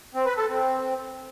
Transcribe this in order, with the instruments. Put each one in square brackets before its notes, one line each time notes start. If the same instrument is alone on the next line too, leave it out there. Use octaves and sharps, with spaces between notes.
[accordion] C4
B4
A4
C4